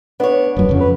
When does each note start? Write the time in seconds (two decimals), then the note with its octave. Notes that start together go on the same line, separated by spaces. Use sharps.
0.20 B3 D4 C#5
0.56 D1 F#2 B3
0.69 F2 C#3
0.80 B4